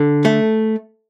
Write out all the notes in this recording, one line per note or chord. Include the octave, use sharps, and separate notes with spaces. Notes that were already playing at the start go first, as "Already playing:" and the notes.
Already playing: D3
A3